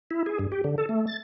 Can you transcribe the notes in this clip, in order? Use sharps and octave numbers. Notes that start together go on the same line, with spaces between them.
E4
G#4
G2
G4
D3
A4
A3
A6